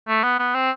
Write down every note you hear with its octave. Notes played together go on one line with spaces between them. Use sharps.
A3
B3
B3
C4